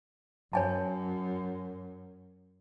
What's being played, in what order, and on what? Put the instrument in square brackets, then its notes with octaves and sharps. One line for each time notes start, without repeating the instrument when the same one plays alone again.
[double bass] F#2 [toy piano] C#5 G#5 A5